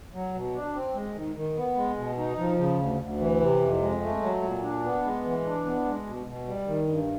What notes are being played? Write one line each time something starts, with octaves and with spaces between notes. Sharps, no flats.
F#3
B2
D4
C4
G#3
D#3
D#3
B3
G#3
B2
D#4
F3
C#3
D2
D2
E3
C3
F2
G#3
A3
F#3
A#2
D4
B3
G#3
E3
D4
B3
G#3
B2
B2
G3
D#3
G2